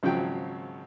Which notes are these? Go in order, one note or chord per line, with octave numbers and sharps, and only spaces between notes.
G#1 C#3 F3 F#3 G5